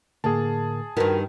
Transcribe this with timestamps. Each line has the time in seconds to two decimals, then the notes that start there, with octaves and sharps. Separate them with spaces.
0.24 A2 D3 A#3 G#4 A5
0.97 G2 D#3 F#4 A#4 B4 B6